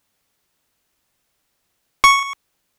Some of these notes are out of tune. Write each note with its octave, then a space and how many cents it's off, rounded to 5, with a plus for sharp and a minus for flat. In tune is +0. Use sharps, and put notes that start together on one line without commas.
C#6 +0